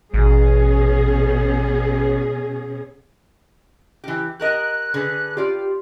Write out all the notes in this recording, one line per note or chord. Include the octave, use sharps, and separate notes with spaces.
A1 B2 C#4 G#4
E3 G4
G4 A#4 D#5 F#6
D3 G#4 B4
F4 G4 D5